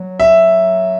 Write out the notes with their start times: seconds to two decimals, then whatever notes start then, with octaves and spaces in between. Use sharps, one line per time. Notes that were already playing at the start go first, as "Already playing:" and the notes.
Already playing: F#3
0.20 E5